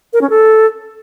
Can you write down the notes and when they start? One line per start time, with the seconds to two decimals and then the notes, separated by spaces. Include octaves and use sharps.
0.13 A#4
0.21 C#4
0.30 A4